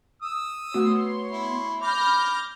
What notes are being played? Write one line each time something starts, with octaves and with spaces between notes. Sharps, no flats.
D#6 E6
A3 B3 F#4 C#5 C6
E4
B5 D6 F6 G6 A#6